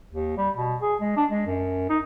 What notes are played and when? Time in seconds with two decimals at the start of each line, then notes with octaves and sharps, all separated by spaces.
0.12 D#2
0.37 G3
0.56 B2
0.81 G#4
1.00 G#3
1.16 D4
1.30 G#3
1.46 F#2
1.90 D#4